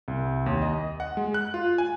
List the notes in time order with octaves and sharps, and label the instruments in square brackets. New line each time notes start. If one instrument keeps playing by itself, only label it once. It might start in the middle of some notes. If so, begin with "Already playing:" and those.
[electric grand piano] C2
D#2
D#5
F#5
G#3
F#6
F4
G#5